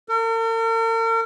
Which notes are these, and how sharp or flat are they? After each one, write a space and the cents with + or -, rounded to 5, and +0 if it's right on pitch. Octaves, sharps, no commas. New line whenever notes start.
A#4 -45